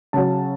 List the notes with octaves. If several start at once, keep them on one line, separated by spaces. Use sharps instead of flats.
C#3 F#3 A5